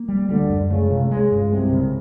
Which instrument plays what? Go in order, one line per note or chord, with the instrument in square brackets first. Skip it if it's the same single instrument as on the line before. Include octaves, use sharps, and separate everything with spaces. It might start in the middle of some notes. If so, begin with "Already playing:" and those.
Already playing: [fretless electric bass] A#3
G3
[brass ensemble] D2 D3 [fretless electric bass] G3
[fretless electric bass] F#2
[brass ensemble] C#2 C#3 [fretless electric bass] A3
[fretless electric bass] C3
[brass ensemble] C#2 C#3 [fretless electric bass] G#3
[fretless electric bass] G2
[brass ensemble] C2 C3 [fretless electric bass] G#3
[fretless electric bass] C#3